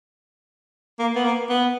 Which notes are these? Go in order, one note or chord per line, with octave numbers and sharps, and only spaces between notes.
A#3
B3
A#3
B3